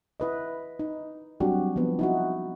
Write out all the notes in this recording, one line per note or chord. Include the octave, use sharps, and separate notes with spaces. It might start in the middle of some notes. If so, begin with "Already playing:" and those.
E4 B4 D#5
D#4
F#3 G3 C4 D4 F#4 G4
F3 B3
D#4 E4 F#4